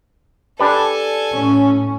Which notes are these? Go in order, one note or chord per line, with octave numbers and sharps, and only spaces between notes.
D4 G4 A4 B4 G#5
A2 C#4